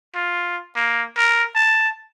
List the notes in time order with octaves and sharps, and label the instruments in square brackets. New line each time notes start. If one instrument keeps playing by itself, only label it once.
[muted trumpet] F4
A#3
A#4
A5